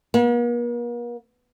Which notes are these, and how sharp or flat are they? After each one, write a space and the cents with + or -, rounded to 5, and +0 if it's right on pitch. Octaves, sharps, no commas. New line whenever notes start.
A#3 +45